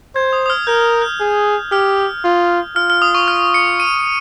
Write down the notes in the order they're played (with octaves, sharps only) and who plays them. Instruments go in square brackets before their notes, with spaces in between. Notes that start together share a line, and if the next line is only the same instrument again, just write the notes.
[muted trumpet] C5 [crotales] G#6
[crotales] D#6
D#6
F6
[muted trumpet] A#4 [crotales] G6
[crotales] G6
[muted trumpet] G#4
[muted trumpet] G4 [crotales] F6
[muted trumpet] F4
[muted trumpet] F4 [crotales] F6
[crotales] F6
D#6
C#6
F6
C#7
D#7